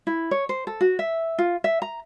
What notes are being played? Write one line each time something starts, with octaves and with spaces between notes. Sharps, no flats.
E4
C#5
C5
A4
F#4
E5
F4
E5
A#5